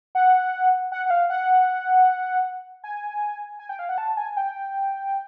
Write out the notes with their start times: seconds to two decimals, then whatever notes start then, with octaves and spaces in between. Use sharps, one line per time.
0.15 F#5
0.92 F#5
1.06 F#5
1.10 F5
1.30 F#5
2.84 G#5
3.59 G#5
3.69 G5
3.79 F5
3.89 F#5
3.98 A5
4.17 G#5
4.37 G5